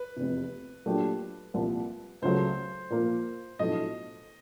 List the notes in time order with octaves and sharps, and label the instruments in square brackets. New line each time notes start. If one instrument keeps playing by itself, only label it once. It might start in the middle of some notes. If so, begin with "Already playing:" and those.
Already playing: [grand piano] B4
[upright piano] F1 E2 C3
A#2 F#3 A3 D4 G4
C2 A#2 F3
[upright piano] C#2 C#3 F#3 A3 [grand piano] C5
[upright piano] A#2 F3 A#3
[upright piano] B1 A2 F3 A3 D4 [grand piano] D#5